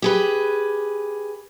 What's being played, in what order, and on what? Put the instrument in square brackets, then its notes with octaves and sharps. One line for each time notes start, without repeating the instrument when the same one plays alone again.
[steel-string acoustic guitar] G4 G#4 B4